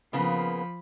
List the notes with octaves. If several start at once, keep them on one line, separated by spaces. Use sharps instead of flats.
C#3 F3 A#3 B3 B5